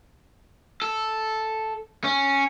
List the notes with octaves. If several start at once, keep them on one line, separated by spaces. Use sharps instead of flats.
A4
C#4